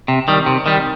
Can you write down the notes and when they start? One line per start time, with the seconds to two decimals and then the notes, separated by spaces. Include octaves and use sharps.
0.08 C3
0.28 D#3 G3
0.46 C3
0.66 D#3 G3